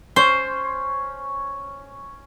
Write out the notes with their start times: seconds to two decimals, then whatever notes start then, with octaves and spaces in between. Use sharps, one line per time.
0.16 C#4 C5